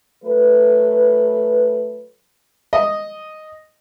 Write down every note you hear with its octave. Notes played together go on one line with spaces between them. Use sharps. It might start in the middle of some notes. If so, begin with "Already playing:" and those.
F#3 A3 B4
D#5